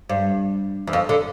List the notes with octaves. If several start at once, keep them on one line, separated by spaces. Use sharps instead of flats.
G2
E2
F2
D3